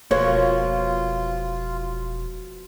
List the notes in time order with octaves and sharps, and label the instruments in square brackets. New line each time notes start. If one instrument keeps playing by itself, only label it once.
[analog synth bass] E1 [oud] B2 F3 A#3 [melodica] F4 [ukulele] C#5